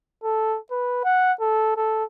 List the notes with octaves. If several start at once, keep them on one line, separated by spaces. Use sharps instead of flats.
A4
B4
F#5
A4
A4